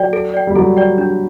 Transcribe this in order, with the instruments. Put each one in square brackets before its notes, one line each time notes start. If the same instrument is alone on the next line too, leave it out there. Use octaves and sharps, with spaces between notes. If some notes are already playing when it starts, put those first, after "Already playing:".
Already playing: [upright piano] F#3 [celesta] A4 D5 G5
[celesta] A4
D5 G5
[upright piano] G3
[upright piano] F#3 [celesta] A4
[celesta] D5 G5
D4